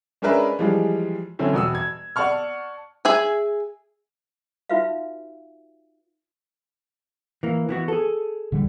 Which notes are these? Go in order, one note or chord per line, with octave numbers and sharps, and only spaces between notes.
G#3 C#4 D4 A#4 B4 E5
E3 F3 G3 G#3
D3 F#3 C4 C#4 E4
E1 F#4 D#6 E6
G#6
D5 F#5 A5 C#6 F6
G#4 E5 G#5
D#4 F4 F#4 B4 E5 F5
E3 A#3
E3 B3 F#4
G#4 A4
D#1 D3 G3